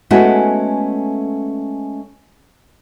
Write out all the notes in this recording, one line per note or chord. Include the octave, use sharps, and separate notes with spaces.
G#3 A3 B3 C#4 E4 F#4